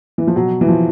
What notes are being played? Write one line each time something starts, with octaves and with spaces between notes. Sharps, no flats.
E3
F3
B2 F#3
E3
F3